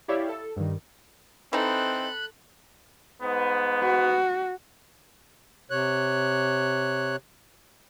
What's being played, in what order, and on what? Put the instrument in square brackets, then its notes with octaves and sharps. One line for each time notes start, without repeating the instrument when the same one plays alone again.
[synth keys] E4 G4 C#5 D5 E5 F5
A4
G2 D#3
[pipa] E3 D#4 [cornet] C4 [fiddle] A4 [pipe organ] B5 F#6
[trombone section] G#2 B3
[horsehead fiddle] F#4
[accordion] C3 C#5 F#6